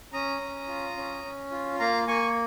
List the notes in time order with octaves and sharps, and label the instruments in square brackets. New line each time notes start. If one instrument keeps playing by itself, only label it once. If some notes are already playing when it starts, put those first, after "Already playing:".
[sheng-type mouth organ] C#4 A#5 D#6
C#4
F4
C#4
C#4
F4
A#3 F5 A#5
A#3 G#5 C#6